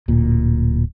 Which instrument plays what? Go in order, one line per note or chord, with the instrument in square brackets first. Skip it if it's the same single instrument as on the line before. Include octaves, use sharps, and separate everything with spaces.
[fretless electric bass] D1 A#2